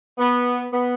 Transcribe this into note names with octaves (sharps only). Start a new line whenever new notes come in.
B3
B3